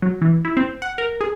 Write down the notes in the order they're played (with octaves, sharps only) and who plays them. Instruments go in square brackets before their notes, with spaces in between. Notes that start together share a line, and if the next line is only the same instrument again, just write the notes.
[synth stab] F#3
E3
E4
C4
F#5
A#4
G#4